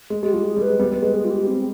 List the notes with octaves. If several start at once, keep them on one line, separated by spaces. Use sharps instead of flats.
G#3
G#3 G4
G3 F4
G#4
G3
B4
G#3
G3 B3
G3
G#3 B4
G#4
F4
G4
C4